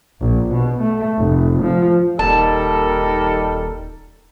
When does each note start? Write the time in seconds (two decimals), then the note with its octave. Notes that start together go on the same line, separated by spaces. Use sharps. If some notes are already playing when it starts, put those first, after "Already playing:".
0.20 A#1
0.52 B2
0.81 A3
1.17 F1
1.63 F3
2.19 D#1 G3 D#4 A4 A#4 A5